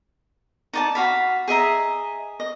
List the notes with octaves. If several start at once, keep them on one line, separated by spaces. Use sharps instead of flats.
D#4 D5 A5
F#4 F5 B5
G#4 D#5 E5 A#5
D#5